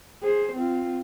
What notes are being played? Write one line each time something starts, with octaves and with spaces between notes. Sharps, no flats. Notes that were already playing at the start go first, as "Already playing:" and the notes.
G#4 C5
C4 F4